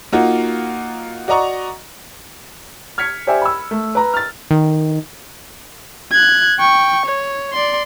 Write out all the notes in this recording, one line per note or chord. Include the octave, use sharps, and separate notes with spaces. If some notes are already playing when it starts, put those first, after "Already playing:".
A#3 D#4 F4 F#4
F#4 D5 D#5 A#5 C#6
F6 G#6 B6 C#7
G4 C5 D5 E5 G#5
B5 E6
A3
B4 A#5
F6 A6
D#3
F#6 G#6
G5 C#6
C#5
D5 C6